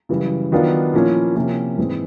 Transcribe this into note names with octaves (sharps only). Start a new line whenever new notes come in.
F#2 C#3 E3 G3
D#3 F#3 B3 D4 F4
A#2 F3 A#3 C#4 E4
C3 F3 A#3 C#4 E4
G#2 E3 G#3 C4